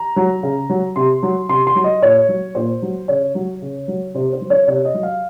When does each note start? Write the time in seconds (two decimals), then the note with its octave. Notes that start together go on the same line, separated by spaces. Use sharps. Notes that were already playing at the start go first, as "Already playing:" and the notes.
Already playing: A#5
0.16 F#3
0.43 C#3
0.69 F#3
0.96 C3 C6
1.23 F#3
1.49 C3 C6
1.67 C6
1.75 F#3
1.84 D#5
2.02 A#2 C#5
2.28 F#3
2.55 A#2 C5
2.82 F#3
3.08 C#3 C#5
3.35 F#3
3.62 C#3
3.88 F#3
4.14 C3 C5
4.33 C5
4.41 F#3
4.50 C#5
4.68 C3 C#5
4.85 D#5
4.94 F#3
5.03 F5